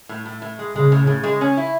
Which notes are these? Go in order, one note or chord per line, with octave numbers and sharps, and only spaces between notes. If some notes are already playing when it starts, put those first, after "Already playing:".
A2
A2
A2
G#3
C#3 G#3
A2
A2
G#3
C#4
E4